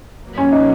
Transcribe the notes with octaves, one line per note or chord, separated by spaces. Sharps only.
B2 F#3 A#3
C#4
D#4